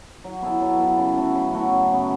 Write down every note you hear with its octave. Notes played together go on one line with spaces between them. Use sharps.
F#3
B3 E4 A4
F#3
B3 E4 A4
C#3
F#3 A3 F#4
C#3
F#3 A3 F#4
F#2
C#3 F#3 B3